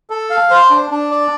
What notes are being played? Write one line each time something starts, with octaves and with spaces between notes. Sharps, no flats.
A4
F5
C5
D4
D4
D5